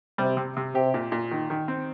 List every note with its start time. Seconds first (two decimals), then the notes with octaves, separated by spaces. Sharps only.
0.18 C3 G3
0.37 C3
0.57 C3
0.75 C3 G4
0.94 A#2
1.12 A#2
1.31 D#3
1.50 D#3
1.68 C4